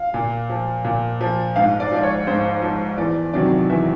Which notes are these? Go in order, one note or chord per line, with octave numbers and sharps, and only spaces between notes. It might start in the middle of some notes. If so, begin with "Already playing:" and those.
Already playing: F5
A#2
F3
A#2
F3
G#2 F5
D5
F3 D5
C#5
G#2 C5
F3
E2 D5
C3 D#3 F#3 D5
E2 E5